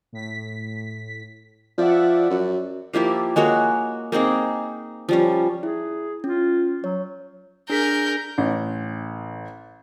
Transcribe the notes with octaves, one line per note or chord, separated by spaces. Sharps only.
A2 B6
F3 D5 E5 F#5
F#2
F3 A#3 E4 G4
G#3 A#3 F#4 C#5
A#3 C4 D#4 G#4
F3 G3 C#4
E4 G#4
C#4 F4
F#3 C#5
D4 G#4 A#4 G6 B6
A1